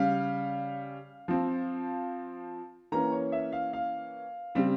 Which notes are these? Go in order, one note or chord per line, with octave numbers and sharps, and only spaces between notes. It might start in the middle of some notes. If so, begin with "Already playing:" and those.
Already playing: C#3 G3 C#4 F5
F3 C4
E3 A#3 C#4 A#5
C#5
E5
F5
F5
C#3 G3 C4